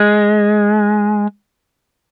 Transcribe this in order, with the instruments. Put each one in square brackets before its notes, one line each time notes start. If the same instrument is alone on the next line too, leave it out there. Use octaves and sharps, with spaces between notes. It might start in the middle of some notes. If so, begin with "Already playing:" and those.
Already playing: [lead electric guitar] G#3